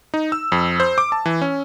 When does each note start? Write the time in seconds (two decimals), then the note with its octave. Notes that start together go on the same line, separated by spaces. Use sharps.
0.14 D#4
0.32 E6
0.52 F2
0.80 C5
0.98 D6
1.12 A5
1.26 E3
1.42 C#4